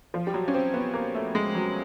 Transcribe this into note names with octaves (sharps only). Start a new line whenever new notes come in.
F3
G3
F#3
C#4
C4
B3
A#3
A3
G#3
F#3